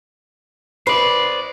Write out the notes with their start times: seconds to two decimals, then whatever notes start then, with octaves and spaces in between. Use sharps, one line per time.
0.87 B4 C5 D5